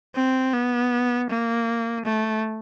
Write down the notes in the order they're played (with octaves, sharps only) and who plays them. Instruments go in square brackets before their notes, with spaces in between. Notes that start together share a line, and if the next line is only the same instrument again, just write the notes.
[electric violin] C4
B3
A#3
A3